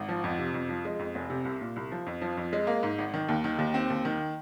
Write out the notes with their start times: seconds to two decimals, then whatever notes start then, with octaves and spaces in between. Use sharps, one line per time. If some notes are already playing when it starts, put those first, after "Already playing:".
Already playing: G#1
0.09 F3
0.24 F2
0.39 C3
0.54 F2
0.69 F3
0.85 G#3
0.99 F2
1.15 F1
1.30 C3
1.45 C2
1.61 A#2
1.76 C2
1.92 F3
2.07 F2
2.22 F3
2.37 F2
2.53 G#3
2.67 A#3
2.83 G#2
2.98 G#1
3.14 D#3
3.28 D#2
3.44 D#3
3.59 D#2
3.74 C4
3.90 D#2
4.05 D#3